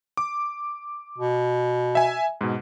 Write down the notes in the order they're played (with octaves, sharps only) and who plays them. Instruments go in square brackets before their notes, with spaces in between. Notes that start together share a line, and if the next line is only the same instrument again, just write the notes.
[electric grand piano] D6
[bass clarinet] B2
[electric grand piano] E5 G#5
G#2 B2